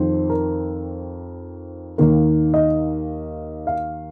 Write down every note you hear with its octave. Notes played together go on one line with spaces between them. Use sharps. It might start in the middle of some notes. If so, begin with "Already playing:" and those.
Already playing: F2 D#3 C4 C5
A#4
D#2 D#3 A#3
D#5
F5